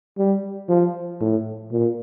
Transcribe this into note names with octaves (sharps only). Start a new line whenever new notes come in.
G3
F3
A2
A#2